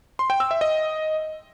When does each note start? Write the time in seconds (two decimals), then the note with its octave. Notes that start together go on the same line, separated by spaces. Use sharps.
0.19 C6
0.30 G5
0.40 E6
0.51 E5
0.61 D#5